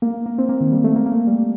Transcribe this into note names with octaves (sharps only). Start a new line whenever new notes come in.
A#3
A#3
C4
A#3
D#3
G3
A3
A#3
A#3
A3
G3